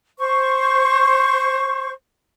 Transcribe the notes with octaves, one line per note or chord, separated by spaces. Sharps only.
C5 C#6